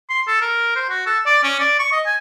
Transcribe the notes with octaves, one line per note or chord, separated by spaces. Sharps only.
C6
A4
A#4
C5
F#4
A4
D5
C#4
D5
C#6
D#5
G#5